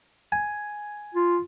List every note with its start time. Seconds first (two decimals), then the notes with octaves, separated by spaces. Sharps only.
0.32 G#5
1.14 F4